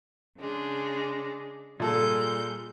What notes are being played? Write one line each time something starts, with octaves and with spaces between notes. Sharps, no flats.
C#3 G#3 D4
A#2 G3 G#3 A4 G6